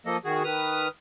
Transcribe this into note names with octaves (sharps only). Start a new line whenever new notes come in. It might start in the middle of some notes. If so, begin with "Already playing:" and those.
F3 A#3 A4 D#5
D#3 F#4 G#4
D#3 B4 D#6 F6